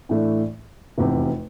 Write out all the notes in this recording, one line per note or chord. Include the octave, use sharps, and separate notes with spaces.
A2 E3 A3 D4
F1 E2 C3